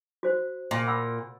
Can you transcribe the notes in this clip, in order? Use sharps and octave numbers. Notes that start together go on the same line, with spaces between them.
F#4 C5
A#2
F#5 B5 E6